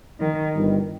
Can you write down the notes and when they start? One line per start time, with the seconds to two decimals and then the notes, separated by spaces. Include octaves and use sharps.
0.20 D#3
0.54 G1 G2 D#3 G3